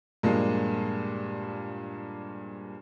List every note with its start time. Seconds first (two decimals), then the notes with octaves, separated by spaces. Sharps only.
0.23 G2 A#2 F3 G#3 A#3